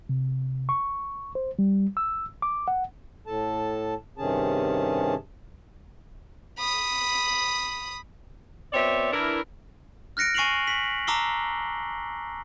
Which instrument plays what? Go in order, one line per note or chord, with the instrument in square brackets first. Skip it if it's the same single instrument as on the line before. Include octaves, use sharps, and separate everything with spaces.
[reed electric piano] C3
C#6
C5
G3
E6
D6
F#5
[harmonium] A2 A4 A5
G2 C3 D#3 C#4 G#4 A5
[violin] B5 D#6
[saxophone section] B2 C4 C#5 D5 E5
E3 D4 E4 A#4
[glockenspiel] F6 F#6 A#6 C#7 D7
G#5 C#6 C7 D7 F7 F#7
B6 F#7
A5 A#5 D6 E6 C7 G7